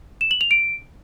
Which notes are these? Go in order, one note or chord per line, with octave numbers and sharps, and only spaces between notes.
E7
F#7
F7
D7